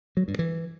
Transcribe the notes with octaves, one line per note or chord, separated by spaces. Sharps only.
F#3
G2
E3